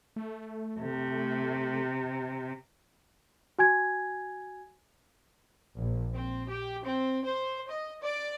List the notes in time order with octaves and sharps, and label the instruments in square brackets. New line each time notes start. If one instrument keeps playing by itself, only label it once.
[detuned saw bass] A3
[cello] C3
[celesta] F#4 G#5 G#6
[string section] A#1
C4
G4
C4
C5
D#5
D5